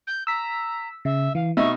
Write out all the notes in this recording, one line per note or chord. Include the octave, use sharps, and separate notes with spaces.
G6
A#5 E6 B6
C#3 E5
E3 F5
B2 D#4 E5 C#6